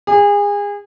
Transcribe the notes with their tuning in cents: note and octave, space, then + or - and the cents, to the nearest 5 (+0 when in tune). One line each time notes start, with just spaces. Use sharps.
G#4 -30